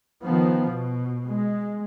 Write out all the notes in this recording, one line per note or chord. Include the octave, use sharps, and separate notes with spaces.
D#3 F3 B3
B2
G#3